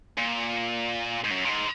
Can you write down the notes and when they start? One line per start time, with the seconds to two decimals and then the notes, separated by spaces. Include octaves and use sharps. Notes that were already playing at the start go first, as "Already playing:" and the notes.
0.18 A#2
1.25 G#2
1.31 F#2
1.45 A#2
1.50 G#2